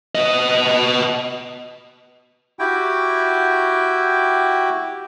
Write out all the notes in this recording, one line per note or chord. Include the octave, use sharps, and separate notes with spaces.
B3 D#5
E4 F#4 G4 G5